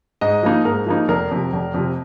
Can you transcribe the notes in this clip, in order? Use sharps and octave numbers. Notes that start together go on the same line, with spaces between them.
G#2 D#5
F3 A#3 D#4
G#2 A#4
F3 A#3 D#4
F1 A#4
F2 C3
F1
F2 C3